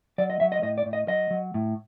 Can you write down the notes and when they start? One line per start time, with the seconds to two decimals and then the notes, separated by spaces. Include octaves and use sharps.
0.18 F#3 D5
0.30 D#5
0.40 F#3 E5
0.52 D#5
0.63 A2 D#5
0.78 D5
0.86 A2
0.93 D#5
1.08 F#3 D#5
1.31 F#3
1.54 A2